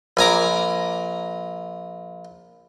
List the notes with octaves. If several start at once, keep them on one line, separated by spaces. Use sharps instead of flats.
A#1 G#5 A#5 D6